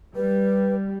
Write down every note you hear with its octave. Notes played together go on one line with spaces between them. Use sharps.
G3 B4